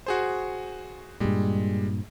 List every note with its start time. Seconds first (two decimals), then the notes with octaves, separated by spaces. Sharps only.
0.06 F#4 G#4 C5
1.20 G2 A#2 G3 G#3